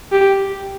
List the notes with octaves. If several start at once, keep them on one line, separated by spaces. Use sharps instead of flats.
G4